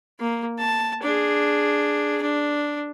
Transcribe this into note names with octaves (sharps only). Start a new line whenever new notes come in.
A#3
A5
D4 G#4
D4